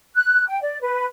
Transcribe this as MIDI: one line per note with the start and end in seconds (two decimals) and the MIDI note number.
0.16 0.46 90
0.47 0.61 79
0.62 0.80 74
0.81 1.06 71